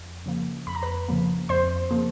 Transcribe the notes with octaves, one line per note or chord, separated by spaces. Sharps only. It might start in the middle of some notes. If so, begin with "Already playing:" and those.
Already playing: F2
C#3 F3 A#3
F2 B5
A#5
B4 B5
C#3 F3 A#3
F2 C5 C6
C#3 F3 A#3